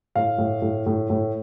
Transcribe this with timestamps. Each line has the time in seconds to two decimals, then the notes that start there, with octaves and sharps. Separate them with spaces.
0.15 A2 F5
0.38 A2
0.62 A2
0.86 A2
1.10 A2